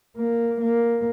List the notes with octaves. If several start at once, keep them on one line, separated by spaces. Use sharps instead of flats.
A#3
A#3